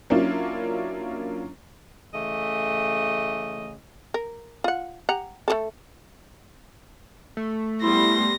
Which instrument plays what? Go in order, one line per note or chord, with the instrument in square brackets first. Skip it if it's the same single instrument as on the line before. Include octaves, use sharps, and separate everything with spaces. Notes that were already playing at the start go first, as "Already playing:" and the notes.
[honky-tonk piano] F#3 A#3 C#4 D4 E4 F4
[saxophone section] C#3 E3 A3 D#5
[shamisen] A#4
F4 F#5
G4 F#5 A#5
A3 G4 A4
[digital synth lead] A3
[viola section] G3 B3 C6 [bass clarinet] E4 [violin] A#6